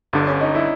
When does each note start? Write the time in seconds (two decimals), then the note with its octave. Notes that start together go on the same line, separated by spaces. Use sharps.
0.13 G1 G2 D3 D4
0.28 C#4
0.41 D#4
0.55 E4